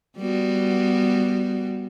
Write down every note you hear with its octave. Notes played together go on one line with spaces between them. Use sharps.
G3 B3 F#4